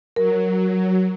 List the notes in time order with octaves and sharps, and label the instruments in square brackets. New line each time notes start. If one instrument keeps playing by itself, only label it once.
[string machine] F#3 [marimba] A#4